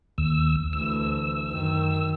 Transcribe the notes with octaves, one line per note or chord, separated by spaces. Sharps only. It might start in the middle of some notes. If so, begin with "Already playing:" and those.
D#2 E6
D2 E3 E6
F#2 D#3